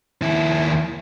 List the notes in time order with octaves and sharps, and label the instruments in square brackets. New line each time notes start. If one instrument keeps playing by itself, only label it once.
[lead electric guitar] D#2 E4